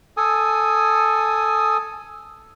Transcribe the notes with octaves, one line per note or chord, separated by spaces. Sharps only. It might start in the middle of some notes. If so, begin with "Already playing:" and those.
A4 G#5 D#6